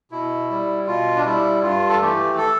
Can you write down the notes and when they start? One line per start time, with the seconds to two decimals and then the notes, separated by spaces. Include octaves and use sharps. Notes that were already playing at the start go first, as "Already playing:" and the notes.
0.12 B2 E4
0.50 G3
0.87 B2 F4
1.16 D4
1.25 G3 E4
1.63 G2 F4
1.89 A4
2.00 E3 A3 G4
2.37 A4